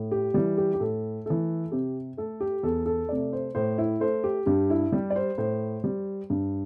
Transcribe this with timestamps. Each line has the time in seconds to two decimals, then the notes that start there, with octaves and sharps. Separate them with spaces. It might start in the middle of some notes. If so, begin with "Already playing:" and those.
Already playing: A2
0.11 G4
0.34 E3 G3
0.57 G4
0.74 G4
0.80 A2 A4
1.26 E3 A3 A4
1.72 C3 G4
2.17 A3 A4
2.40 G4
2.63 E2 A4
2.86 A4
3.09 C3 A3 D5
3.33 C5
3.55 A2 C5
3.78 E4
4.00 A3 C5
4.24 G4
4.46 G2 G4
4.70 E4
4.92 G3 G4
5.10 D5
5.16 C5
5.38 A2 C5
5.84 G3
6.30 G2